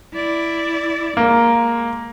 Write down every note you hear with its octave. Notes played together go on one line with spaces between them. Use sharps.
E4 D5
G#3 A#3